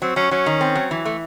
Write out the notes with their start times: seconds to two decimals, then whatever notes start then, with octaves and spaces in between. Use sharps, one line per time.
0.02 F#3 C4
0.16 F#3 C#4
0.31 F#3 C#4
0.46 D#3
0.61 C4
0.76 F#3
0.91 E3
1.05 A3